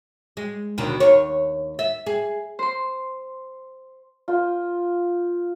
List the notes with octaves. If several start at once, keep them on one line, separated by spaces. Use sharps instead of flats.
G#3
D#2 B2 D3
D#2 C#5
E5
G#4
C5 C6
F4 C5